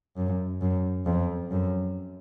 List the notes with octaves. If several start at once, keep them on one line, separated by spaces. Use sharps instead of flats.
F#2
F#2
F2
F#2